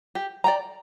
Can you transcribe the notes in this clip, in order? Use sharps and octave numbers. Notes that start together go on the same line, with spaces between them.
G4
D5 G5 A#5